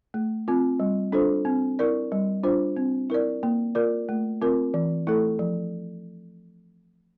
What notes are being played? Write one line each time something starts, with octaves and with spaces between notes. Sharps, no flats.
A3
C4 F4
G3
D4 F4 A4 C5
C4
E4 A#4 D5
G3
D4 F4 C5
C4
E4 A#4 D5
A#3
F4 A#4 D5
A3
C4 F4 A#4
E3
A3 E4 A4
F3